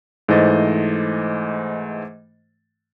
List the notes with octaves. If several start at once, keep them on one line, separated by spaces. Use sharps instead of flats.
G#2 E3 A3 C5 D#5 A6